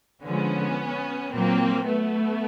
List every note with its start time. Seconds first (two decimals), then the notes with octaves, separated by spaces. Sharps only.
0.23 D3 F3 G#3 B3 C#4
1.32 A#2 F#3 A#3 C4
1.87 A3 B3